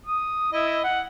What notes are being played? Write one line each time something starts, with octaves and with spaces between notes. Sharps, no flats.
D#6
E4 D#5
F#5